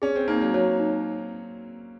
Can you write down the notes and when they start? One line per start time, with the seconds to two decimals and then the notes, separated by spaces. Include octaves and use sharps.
0.02 C#4 G#4
0.16 C4
0.28 A#3 D#4
0.41 F#3
0.54 F#3 C#5
0.80 D#4